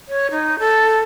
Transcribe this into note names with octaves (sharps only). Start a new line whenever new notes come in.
C#5
D#4
A4